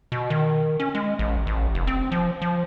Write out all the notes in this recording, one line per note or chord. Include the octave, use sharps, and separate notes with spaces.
B2
D#3
C#4
G#3
A1
A1
F1
C4
F3
F3